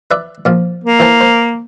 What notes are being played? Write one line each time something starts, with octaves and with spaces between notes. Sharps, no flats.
B4 D5 E5
A#2 F3
A#3
E3 C5 A5
C5